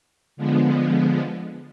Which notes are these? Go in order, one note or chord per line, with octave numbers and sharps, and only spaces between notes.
D3 F3 G#3 B3